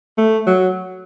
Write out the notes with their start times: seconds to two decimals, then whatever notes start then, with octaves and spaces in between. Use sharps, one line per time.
0.18 A3
0.47 F#3